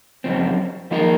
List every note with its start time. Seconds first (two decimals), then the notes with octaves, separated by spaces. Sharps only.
0.24 F#2 C#3 F3 C4
0.91 D#3 F3 A#3 F4 A#4